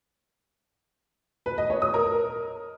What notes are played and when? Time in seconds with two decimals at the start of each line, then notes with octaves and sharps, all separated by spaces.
1.46 B4
1.58 D#5
1.70 C#5
1.82 D#6
1.94 A#4